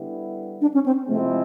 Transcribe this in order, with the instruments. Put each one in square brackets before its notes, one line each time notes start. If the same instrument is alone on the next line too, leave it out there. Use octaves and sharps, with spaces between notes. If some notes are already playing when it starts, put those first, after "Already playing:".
Already playing: [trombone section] D3 G3 B3 E4
[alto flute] D4
C#4
C4
[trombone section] C3 F3 G#3 C4 E4 [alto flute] A3